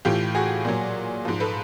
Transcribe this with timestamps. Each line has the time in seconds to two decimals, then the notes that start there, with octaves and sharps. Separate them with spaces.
0.05 A2 E3 F4 G4
0.35 F#4 G#4
0.65 A#2 F#3
1.25 G#2 F3
1.40 A4 B4